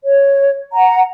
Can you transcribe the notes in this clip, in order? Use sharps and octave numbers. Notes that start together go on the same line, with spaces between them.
C#5
F#5 A#5